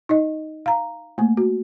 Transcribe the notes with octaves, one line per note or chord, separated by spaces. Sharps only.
D#4 D#5
F5 A#5
A3 A#3
F#4